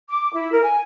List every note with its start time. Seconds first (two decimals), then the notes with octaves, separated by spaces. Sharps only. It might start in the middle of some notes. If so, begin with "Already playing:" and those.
0.09 D6
0.33 E4
0.50 A#4
0.62 G#5